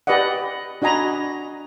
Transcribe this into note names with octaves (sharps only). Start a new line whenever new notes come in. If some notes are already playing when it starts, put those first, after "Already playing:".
G4 B4 D5 D#5 F#5
D4 F#4 D#5 G#5 A#5 B5